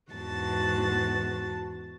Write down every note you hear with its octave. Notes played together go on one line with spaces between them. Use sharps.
E2 G#2 F#4 A5 A6